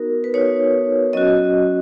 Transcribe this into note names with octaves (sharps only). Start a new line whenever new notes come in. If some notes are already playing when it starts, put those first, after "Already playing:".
Already playing: B3 D#4 F#4 A#4
B4
B3 D#4 F#4 C#5
F#3 C#4 F#4 D#5